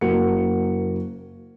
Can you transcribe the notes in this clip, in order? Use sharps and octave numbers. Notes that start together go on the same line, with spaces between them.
F#1 A#3 F#4 C#7